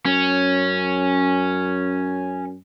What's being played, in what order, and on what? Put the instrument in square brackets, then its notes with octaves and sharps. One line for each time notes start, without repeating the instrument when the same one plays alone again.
[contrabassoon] F#2 [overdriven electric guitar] C#4